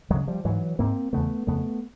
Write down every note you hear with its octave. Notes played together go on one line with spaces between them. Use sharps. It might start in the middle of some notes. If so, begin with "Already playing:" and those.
F#2 C#3 F#3 G#3
F3 G3
G#2 E3 F#3
G#2 A#3 C4
E2 C#3 A3 B3
F2 C#3 A3 B3